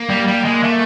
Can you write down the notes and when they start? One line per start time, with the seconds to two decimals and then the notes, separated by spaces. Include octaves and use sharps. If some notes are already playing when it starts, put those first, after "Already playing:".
Already playing: A#3
0.10 G3
0.28 G3
0.45 G#3
0.63 A3